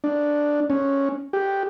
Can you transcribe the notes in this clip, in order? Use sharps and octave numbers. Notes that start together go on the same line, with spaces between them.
D4
C#4
G4